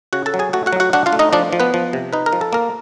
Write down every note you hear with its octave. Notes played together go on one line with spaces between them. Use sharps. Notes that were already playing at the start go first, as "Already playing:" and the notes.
C#3 F#4 F#5
A4 A5
F#3
G#4 G#5
A3 F#4 F#5
F#4 F#5
F#3
F#4 F#5
D4 F#4 F#5
F4 F5
A3
D#4 D#5
F3 D4 D5
F3
B3 B4
F3
C3
D#4 B4
A#4
F3
A4
A#3 A#4